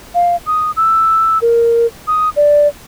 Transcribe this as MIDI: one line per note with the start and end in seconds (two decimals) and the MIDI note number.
0.15 0.36 77
0.47 0.71 87
0.76 1.38 88
1.42 1.86 70
2.07 2.29 87
2.36 2.68 74